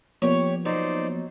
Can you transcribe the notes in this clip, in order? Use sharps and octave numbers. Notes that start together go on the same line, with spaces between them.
F3 A#3 B3 G4 C#5
F#3 D#4 C5 D5